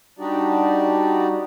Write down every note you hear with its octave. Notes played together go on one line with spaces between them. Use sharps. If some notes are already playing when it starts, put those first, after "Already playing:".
G3 D4 D#4 F#4 G4 D5